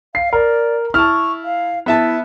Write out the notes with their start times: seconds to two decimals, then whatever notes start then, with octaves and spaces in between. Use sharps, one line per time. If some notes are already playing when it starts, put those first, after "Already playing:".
0.15 F5 C7
0.33 A#4 D5
0.94 E4 A5 C#6 F6
1.44 F5
1.86 B3 E4 E5 A5